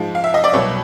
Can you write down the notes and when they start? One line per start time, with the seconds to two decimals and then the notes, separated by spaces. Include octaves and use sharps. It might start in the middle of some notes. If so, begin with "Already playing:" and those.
Already playing: G#2 F3 G#3
0.15 F5
0.24 E5
0.34 D#5
0.44 D5
0.53 C2 B2 F#3 C#5